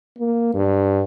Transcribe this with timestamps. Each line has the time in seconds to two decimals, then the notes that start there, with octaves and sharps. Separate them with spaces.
0.19 A#3
0.54 G2